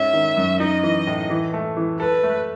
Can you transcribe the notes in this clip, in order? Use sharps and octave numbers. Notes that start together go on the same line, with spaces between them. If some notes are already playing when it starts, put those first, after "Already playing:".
Already playing: G#2 C#4 E5
D#3
F#2
D#4 D#5
E3
A2
E3
A3
E3
A4 B4
A3